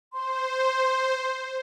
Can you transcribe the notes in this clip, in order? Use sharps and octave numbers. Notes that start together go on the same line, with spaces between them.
C5 C6